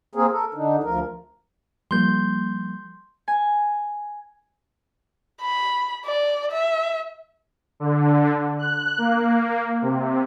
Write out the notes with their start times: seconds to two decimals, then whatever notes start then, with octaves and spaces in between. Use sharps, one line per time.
0.15 A#3 C4 G#4 A#4
0.31 A4 A#4
0.54 D3 D4 D#4
0.83 D2 F3 A#4
1.91 F3 G3 A#3 C6 G6
3.28 G#5
5.41 B5
6.05 D5
6.51 E5
7.80 D3
8.58 F#6
8.98 A#3
9.82 C3